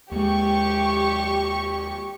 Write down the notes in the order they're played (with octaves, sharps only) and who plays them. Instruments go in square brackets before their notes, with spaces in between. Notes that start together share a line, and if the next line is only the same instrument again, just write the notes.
[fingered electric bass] D#2 G#3 [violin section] G4 C#6